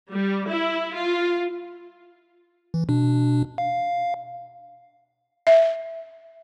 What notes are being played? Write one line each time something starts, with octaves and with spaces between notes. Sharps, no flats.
G3
E4
F4
E3
B2 D4
F5
E5